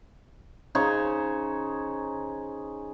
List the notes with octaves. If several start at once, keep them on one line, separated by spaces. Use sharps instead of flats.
C#3 D#4 C5 C#5